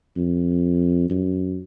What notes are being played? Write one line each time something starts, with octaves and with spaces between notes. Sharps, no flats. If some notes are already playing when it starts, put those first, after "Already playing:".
F2
F#2